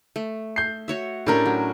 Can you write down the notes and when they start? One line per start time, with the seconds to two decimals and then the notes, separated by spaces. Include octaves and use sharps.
0.16 A3
0.56 G6 C7
0.88 F#4 C#5 E5
1.27 A2 C#4 D4 G4 A#4
1.46 F#3